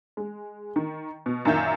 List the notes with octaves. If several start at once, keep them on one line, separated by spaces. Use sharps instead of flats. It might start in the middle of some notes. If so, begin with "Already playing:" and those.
G#3
D#3
B2
F#2 A#2 D#3 E5 G6